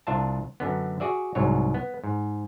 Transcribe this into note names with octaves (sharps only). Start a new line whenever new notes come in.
C2 D4 F4 E5 A5
F#2 D3 B3
F#4 G#4 D5 E5
C2 G#2 F#3 C#5
B3
G#2